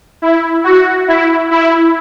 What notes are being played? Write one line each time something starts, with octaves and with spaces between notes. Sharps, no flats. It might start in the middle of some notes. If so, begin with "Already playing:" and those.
E4
F#4
E4
E4